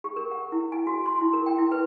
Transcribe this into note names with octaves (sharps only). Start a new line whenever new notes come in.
G4
A#4
F#5
E4
G#5
F#4
C6
E4
A#4
G5
E4
B4